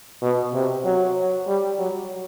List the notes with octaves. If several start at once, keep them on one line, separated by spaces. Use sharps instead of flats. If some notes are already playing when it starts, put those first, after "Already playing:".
B2
C3
F#3
G3
F#3